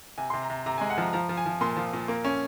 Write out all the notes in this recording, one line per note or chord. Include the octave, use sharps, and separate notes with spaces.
C3 G#5
C6
C3
A#5
C3
C3 A#5
G#5
G#3
F#5
F3 A#5
F3 A#5
F3
G#5
F3
A#2 C6
F3
A#2
A#3
C#4